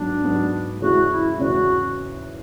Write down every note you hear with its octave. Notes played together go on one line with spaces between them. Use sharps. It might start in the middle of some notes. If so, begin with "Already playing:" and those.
Already playing: G#2 F#3 B3 D4
G#2 F#3 B3
E2 C#3 G#3 C#4 E4 F#4
E4
E2 C#3 G#3 C#4 E4 F#4